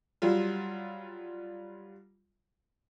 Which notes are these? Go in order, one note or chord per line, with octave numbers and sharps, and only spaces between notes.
F#3 G3 F4